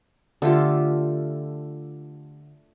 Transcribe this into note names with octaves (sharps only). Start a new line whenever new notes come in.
D3 A3 F4 G4